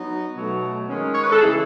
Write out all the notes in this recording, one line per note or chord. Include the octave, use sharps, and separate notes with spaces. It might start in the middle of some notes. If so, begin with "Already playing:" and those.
Already playing: F#3 B3 D#4
B2 F#3 A3
D#3 G#3 C#4
C#5
B4
A4
C#3 E3 A3 E4 G#4